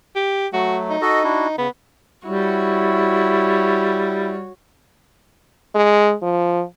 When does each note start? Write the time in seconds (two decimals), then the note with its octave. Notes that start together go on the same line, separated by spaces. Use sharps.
0.16 G4
0.53 F#3 A3 F#4
0.90 D#4
1.02 F#4 A4 D#5
1.24 D4 E4 F#4
1.58 C#3 B3
2.26 G3 E4 F#4 C#5
5.75 G#3
6.22 F3